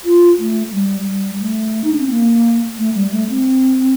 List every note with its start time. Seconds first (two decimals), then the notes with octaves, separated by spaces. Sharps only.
0.05 F4
0.39 A3
0.73 G3
1.07 G3
1.41 A3
1.84 D#4
1.93 D4
2.00 C4
2.10 A#3
2.78 A3
2.95 G3
3.12 A3
3.30 C4